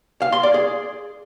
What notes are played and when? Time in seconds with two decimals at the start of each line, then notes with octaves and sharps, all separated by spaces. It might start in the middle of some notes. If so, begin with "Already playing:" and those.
0.22 F5
0.32 C6
0.43 D5
0.54 G#4